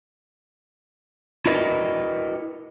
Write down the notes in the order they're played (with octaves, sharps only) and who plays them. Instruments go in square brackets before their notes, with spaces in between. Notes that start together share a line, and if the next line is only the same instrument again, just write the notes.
[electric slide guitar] E4 F#4 A#4 B4 D5 D#5